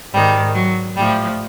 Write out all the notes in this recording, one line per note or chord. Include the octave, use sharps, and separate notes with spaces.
G#2 D#3 G3
F#3
A2 F3 G3